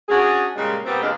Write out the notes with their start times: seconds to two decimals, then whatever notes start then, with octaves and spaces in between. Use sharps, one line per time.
0.09 C#4 D4 F#4 G#4
0.55 A#2 C#3 G3 G#3
0.84 A#2 G3 B3 C4
1.01 D#2 A3 D4 F4 G#4 D#5